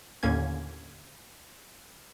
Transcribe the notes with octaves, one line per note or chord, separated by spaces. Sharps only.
D#2 A2 D3 A#3 C#4 G#6